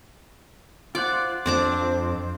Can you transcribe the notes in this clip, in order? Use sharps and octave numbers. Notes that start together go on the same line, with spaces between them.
F4 C5 D5 F#5
F2 C4 D4 C5 D6